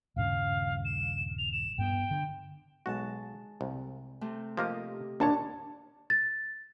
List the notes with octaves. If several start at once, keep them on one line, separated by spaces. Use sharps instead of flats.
D#1 G2 C#3 F5
E7
F7
E7
G2 B3 G5
D3
B1 G#3 F#4 A5
C2
C3 A3 C4
F3 A#3 G4 A#4 D#5
D#2 A#2 D4 C#5 A5
A6